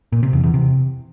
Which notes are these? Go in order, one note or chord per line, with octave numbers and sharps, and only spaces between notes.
A#2
C3
E2
E2
C3